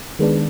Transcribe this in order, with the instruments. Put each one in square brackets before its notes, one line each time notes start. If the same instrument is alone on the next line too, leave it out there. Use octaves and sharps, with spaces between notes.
[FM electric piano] D#3 G#3 B3 D4